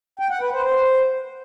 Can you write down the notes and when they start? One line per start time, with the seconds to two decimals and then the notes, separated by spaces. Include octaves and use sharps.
0.19 G5
0.30 F#5
0.41 B4
0.52 C5
0.63 C5